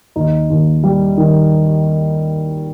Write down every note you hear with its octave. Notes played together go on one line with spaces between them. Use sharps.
D#2 D#4
D#2
G3
D#3